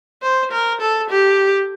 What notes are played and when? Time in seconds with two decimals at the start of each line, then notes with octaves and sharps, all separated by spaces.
0.23 C5
0.52 A#4
0.81 A4
1.10 G4